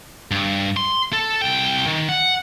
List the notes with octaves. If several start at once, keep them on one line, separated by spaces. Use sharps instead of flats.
G2
C6
A4
C2 G5
D#3
F#5